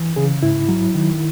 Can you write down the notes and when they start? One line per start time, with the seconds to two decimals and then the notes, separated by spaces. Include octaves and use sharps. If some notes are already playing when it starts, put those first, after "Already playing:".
Already playing: E3
0.16 C#3 G#4
0.43 G#2 E4
0.69 F#3
0.95 D#3